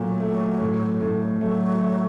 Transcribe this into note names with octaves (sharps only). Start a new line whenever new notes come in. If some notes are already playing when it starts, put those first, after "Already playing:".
Already playing: A#2 F#3 A3
A3
A2
A2
F3
F#3 A3
A3